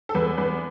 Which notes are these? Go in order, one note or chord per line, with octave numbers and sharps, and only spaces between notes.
A4
E2 B4
E2 B4